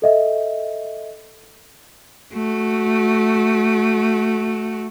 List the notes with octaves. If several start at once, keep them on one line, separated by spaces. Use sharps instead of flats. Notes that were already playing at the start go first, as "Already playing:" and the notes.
A4 D#5 E5
A3 F#4